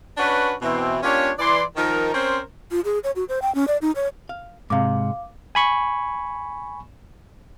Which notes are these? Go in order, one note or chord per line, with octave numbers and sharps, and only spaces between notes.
C#4 D4 F#4 B4
B2 E3 C4
A#3 C#4 D4 F4 G4 C#5
E3 D5 C6
D#3 F3 D#4 A#4
C4 C#4 A#4 C5
F4
G#4
C#5
F#4
C5
G5
C#4
D5
D#4
C#5
F5
G#2 C3 F5 D6
G#5 B5 C#6